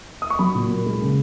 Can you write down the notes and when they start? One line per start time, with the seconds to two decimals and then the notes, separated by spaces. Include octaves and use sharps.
0.22 D#6
0.30 C#6
0.39 F#3 B5
0.55 A#2
0.70 A#3
0.86 G#3
1.01 C#3